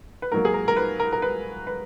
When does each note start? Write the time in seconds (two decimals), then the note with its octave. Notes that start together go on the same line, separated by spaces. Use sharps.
0.22 B4
0.32 G#2 F#3 A#3 A#4
0.45 G#4
0.54 A#4
0.68 A#4
0.76 B4
1.00 A#4
1.13 A#4
1.22 B4
1.67 B4